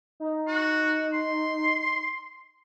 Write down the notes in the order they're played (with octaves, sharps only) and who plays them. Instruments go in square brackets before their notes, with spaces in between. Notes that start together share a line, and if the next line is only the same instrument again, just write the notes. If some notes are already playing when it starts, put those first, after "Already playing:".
[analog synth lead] D#4
[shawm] F#4
C6